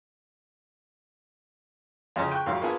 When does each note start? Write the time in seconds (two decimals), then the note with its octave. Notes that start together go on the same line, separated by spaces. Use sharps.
2.16 F2 C#3 C#4 D#5 A5 F6
2.32 G5 C#6 F#6
2.46 G#1 F2 D#3 F#3 F5 C#6
2.61 A#3 B3 D4 F4 G#4 B4